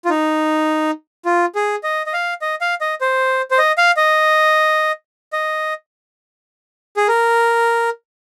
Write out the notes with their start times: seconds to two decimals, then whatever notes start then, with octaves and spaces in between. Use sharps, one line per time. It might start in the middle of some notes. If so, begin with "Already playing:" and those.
0.05 F4
0.10 D#4
1.25 F4
1.55 G#4
1.83 D#5
2.06 D#5
2.13 F5
2.42 D#5
2.61 F5
2.81 D#5
3.01 C5
3.51 C5
3.58 D#5
3.78 F5
3.97 D#5
5.33 D#5
6.97 G#4
7.08 A#4